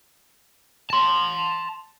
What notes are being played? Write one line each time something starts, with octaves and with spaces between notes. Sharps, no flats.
A5 C6